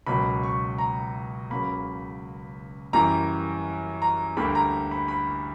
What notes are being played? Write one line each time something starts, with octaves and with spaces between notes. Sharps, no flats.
C#2 B2 F#3 A#3 B5
C#6
A#5
C#2 C#3 F#3 A#3 B5
F#2 E3 G3 A#3 A#5
A#5
D2 D3 G3 A#3 B5
A#5
B5
B5